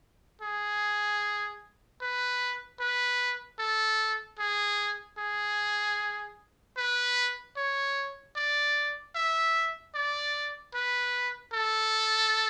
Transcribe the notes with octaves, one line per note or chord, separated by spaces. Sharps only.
G#4
B4
B4
A4
G#4
G#4
B4
C#5
D5
E5
D5
B4
A4